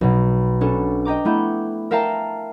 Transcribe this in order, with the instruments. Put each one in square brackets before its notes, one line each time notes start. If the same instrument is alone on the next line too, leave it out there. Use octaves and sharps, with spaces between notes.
[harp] B1 B2
B3 C#4 D4 A4
D#5 G5 A#5 D6
A3 B3 E4 G6
A#4 E5 F5 G5 A5 A#5